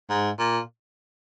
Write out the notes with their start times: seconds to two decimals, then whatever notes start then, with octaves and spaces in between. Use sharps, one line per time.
0.10 G#2
0.39 A#2